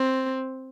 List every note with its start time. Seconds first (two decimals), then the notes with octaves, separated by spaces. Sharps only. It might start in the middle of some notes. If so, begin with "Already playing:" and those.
Already playing: C4